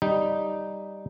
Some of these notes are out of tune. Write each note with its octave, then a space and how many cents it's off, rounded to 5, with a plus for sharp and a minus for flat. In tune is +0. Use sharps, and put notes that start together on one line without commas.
G3 +0 D#4 +0